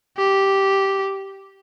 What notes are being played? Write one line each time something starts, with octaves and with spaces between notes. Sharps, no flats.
G4